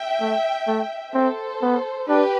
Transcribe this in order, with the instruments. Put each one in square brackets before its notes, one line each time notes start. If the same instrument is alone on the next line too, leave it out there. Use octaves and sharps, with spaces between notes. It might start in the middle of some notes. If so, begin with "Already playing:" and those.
Already playing: [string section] E5 G5
[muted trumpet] A3
A3
[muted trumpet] C4 [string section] A4 C5
[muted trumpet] B3
[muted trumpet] D4 [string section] G4 B4